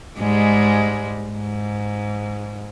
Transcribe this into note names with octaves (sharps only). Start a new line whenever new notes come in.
G#2 G3 G#3
G#2